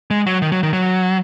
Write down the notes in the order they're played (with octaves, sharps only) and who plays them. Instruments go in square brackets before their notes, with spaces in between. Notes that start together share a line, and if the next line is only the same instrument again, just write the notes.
[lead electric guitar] G#3
F#3
D#3
F#3
D#3
F#3